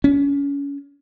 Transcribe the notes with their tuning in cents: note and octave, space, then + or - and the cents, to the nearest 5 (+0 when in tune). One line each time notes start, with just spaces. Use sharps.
C#4 +30